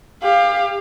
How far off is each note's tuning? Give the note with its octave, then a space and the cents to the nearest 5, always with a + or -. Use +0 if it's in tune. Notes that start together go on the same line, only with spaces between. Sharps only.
G4 +30 F5 +0